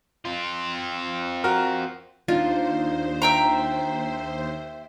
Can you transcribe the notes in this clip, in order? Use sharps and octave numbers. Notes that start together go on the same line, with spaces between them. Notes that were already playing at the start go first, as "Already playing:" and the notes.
C4 F4
F#4 A#4 F6
D#2 D4 D#4 F4 C5
E5 G5 A#5